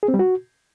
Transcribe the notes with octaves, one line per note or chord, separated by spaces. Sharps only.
G#4
C4
G3
F#4